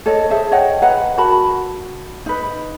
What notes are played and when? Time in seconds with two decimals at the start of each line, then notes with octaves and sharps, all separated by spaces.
0.06 A4 C#5 D#5
0.30 G#4 C5 E5 A5
0.51 C#5 D#5 F#5 G5
0.82 B4 D#5 F#5 A#5
1.18 F#4 A#4 A5 B5
2.26 D#4 B4